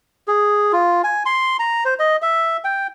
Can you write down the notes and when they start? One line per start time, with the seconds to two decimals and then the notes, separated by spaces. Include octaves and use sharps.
0.28 G#4
0.73 F4
1.04 G#5
1.26 C6
1.59 A#5
1.85 C5
1.99 D#5
2.22 E5
2.64 G5